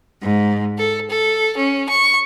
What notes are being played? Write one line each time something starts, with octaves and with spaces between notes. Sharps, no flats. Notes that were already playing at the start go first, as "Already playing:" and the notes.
G#2
A4
A4
C#4
C#6